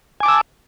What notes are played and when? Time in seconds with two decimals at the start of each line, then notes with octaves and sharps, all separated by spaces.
0.20 G#5
0.23 D6
0.26 A5
0.28 E6